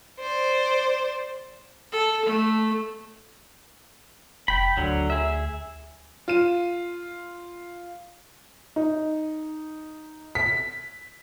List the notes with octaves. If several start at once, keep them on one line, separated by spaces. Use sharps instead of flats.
C5 D5
A4
A3
F1 G5 B5
D2 D3 F#3
G#4 E5
F4 D#7
D#4
B6